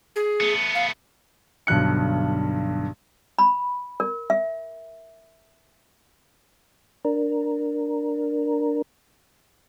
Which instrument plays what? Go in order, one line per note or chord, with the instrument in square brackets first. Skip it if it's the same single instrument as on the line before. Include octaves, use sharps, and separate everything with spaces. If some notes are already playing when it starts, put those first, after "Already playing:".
[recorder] G#4
[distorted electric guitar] A3 B3
[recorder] F5
[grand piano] B1 G2 D3 F#6 C#7
[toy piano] B5
A#4
E5
[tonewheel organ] D4 A#4